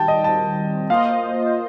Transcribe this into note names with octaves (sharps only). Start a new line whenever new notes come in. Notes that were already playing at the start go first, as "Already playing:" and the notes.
Already playing: D#3 G3 G5 A5
D#5
D#3 G3 C4 A5
A#3 F4 C5 D#5 F5